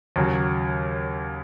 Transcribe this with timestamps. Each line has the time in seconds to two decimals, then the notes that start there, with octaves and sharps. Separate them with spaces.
0.16 D#2 C#3 F#3